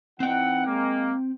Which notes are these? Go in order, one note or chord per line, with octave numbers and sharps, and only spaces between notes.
E3 C4 D#4 F#5 G5
G#3 A#3